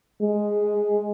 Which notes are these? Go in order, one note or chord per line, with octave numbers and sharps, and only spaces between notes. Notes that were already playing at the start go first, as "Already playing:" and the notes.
G#3